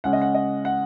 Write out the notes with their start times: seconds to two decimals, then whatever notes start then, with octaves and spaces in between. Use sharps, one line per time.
0.04 C#3 G#3 C#4 F#5
0.13 D#5
0.22 F#5
0.35 D#5
0.65 F#5